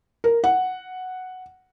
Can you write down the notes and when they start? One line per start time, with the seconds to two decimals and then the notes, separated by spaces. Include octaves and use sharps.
0.24 A#4
0.44 F#5